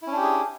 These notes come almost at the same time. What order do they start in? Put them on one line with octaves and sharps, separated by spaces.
E4 C#4 D4 G4 G#4